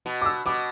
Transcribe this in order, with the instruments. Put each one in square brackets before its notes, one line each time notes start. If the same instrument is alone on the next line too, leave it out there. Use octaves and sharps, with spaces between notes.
[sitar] B2
[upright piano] D6
E6
[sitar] B2 [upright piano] D6